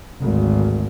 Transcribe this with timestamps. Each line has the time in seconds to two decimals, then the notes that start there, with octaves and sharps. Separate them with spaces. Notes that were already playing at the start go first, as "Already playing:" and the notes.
0.22 G#1 D2